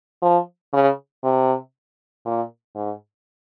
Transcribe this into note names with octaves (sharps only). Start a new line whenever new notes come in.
F3
C#3
C3
A#2
G#2